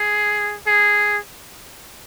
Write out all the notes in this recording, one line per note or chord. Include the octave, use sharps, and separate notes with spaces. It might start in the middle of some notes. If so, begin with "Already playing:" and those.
Already playing: G#4
G#4